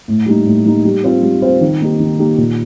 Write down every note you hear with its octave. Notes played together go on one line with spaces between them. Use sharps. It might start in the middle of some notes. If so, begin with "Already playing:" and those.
A2
G3 A#3 D#4
A2
G3 A#3 D#4
G3
C4 F4 C5
G3
C4 F4 C5
D#3
A#3 D#4 G4
D#3
A#3 D#4 G4
A#2